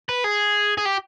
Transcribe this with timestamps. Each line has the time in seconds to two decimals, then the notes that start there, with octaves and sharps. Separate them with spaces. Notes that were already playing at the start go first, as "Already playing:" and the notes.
0.09 B4
0.24 G#4
0.78 G#4
0.85 G4